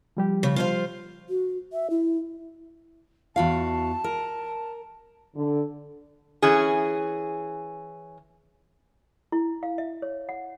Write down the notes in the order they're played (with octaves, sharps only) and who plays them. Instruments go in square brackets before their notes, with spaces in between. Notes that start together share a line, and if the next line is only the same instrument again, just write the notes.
[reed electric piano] F3 G3 G4
[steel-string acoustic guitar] C#3
F4 C5 F5
[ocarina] F#4
E5
E4
[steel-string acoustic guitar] E2 F#4 F5 [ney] A5
[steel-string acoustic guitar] A#4
[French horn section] D3
[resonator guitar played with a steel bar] E3 C#4 G#4
[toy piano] E4
F5
E5
C#5
F#5